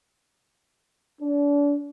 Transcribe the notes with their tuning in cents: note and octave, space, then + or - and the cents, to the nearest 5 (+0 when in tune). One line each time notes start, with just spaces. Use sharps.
D4 -35